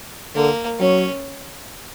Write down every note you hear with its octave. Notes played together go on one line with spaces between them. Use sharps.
D3 A#3
F#3 C#4